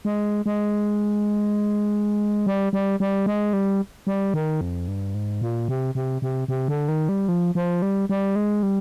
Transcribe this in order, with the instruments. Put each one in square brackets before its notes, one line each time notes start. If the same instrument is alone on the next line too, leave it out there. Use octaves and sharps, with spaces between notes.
[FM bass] G#3
G#3
G3
G3
G3
G#3
G3
G3
D#3
F2
G2
G#2
A#2
C3
C3
C3
C3
D3
D#3
G3
F3
F3
G3
G3
G#3
G3